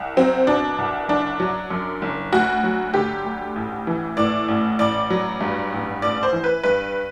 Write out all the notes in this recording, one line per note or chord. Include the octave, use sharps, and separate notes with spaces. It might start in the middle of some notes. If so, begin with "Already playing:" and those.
Already playing: C2
F#3 C4
B2 D4
C2
F#1 D4
F#3
F#2
F#1
D2 F#4
F#3
D3 G4
D2
A1
E3
A2 D5
A1
A1 D5
F#3
G2
A1
A1 D5
C5
E3
B4
G2 B4